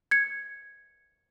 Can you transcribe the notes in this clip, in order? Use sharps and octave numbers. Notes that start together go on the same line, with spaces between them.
G#6 C#7